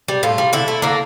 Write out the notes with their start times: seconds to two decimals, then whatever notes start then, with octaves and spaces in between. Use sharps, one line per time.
0.08 G3
0.23 A2 F4
0.38 G3
0.53 D3 E4
0.68 A3
0.82 D3 A#3